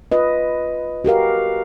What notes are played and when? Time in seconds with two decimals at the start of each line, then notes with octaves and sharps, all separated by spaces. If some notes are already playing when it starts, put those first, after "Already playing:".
0.12 F4 B4 D#5
1.04 F#4 G4 A#4 F5